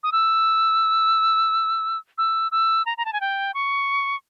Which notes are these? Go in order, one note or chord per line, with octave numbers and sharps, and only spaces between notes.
D#6
E6
E6
E6
A#5
A#5
A5
G#5
G5
C#6